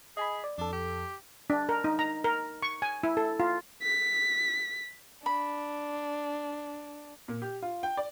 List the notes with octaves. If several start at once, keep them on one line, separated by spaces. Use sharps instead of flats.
G#4 D#5 G#5 B5
D5
F2 D4 A4
G4
D4
A#4
D#4
A#5
A#4
C#6
G#5
E4
A4
F4
B6
D4 B5
A#2
G4
F4
G5
D5